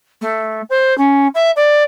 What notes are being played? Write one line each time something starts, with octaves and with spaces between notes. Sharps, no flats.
A3
C5
C#4
E5
D5